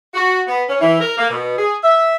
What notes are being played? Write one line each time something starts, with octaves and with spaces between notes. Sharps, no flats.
F#4
B3
C#4
E3
A#4
A#3
B2
G#4
E5